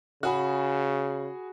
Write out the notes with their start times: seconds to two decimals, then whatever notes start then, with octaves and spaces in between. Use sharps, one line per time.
0.23 C#3 F#4 G#4 B5